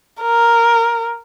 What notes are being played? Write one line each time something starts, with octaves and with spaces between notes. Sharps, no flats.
A#4